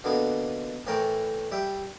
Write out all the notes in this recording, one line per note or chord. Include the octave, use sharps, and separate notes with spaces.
B2 D3 A#3 B3
A2 E3 A3 A#4 G5
G3 E5 G5